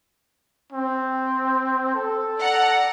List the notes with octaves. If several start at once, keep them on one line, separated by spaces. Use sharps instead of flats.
C4
A4
D5 F#5 A#5